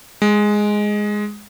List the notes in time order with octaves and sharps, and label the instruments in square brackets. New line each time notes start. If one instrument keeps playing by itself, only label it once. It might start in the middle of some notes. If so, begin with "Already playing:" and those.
[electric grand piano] G#3